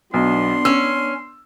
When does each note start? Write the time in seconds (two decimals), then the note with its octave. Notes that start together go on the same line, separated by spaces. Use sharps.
0.14 B1 B3 D4 C6
0.65 C#4 E6